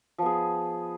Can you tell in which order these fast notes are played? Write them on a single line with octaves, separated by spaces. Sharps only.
F3 B3 G#4